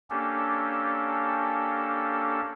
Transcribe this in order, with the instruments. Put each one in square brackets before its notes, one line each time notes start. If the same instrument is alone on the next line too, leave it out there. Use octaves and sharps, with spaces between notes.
[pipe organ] A#3 C#4 D4 G4 A4